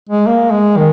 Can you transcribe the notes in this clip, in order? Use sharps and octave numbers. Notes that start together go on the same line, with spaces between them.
G#3
A#3
G#3
D#3